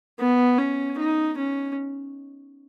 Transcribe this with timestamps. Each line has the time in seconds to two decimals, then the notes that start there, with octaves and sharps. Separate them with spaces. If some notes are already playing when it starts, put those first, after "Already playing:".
0.20 B3
0.58 C#4
0.98 D#4
1.38 C#4